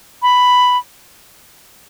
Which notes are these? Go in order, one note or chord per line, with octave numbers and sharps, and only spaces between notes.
B5